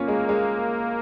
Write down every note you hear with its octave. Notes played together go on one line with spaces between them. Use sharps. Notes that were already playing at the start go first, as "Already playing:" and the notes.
Already playing: A#3 C#4 F4
G#3
G#3